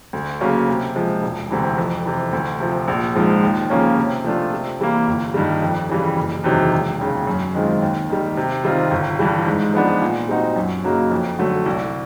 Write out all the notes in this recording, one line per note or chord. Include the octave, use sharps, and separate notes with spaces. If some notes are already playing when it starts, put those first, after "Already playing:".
D2
C#3 F#3 A#3 C#4
C3
F3 G#3
E1
D2 C3 E3
F2
C3 E3
D2
C3 F3
A#1
G#2 F3
D#2
C#3 F3 A#3 C#4
C3
F3 A3 D4 F4
C3
E3 G3 A#3
G1
G2 D#3 G3
F2
C#3 E3 G3
F#1
E2 C3 D#3 F#3
E1
D#2 C#3
F#2
D#3 G#3 C4 F4
D#2
D#3 G3
C3
D#3 G3 C4 F4
G1
G2 E3 G3
G#2
F3 G#3 B3 D4
A#2
G3 C4 D#4 F#4
F#2
C#3 F#3 A#3 D#4
F2
D3 F#3 A3
C2